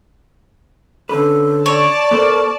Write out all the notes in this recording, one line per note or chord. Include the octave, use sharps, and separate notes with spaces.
D3 C#4 A4 B4
C#5 D5 A5
B3 A4 A#4 C5